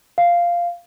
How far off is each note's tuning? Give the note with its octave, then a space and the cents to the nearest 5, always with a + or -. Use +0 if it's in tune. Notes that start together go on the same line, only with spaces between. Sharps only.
F5 -5